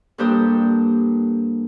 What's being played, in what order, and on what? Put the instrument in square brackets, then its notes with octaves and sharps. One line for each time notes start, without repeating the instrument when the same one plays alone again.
[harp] G2 A#3 G4 A4 C5 D#6